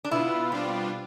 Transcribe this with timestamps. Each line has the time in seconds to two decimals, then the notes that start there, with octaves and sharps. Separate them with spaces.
0.05 D4
0.11 B2 B3 E4 F4
0.51 B2 G3 C4 D4 F4